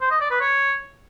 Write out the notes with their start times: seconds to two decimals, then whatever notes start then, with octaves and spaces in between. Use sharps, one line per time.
0.01 C5
0.11 D#5
0.21 D5
0.31 B4
0.40 C#5